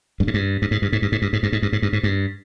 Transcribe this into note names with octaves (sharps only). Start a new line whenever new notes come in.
G2
G#2
G2
G2
G#2
G2
G#2
G2
G#2
G2
G#2
G2
G#2
G2
G#2
G2
G#2
G2